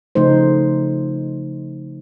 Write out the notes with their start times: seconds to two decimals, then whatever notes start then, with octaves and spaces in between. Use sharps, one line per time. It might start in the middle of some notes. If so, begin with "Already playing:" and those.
0.15 C#3 F3 A3 D#4 C5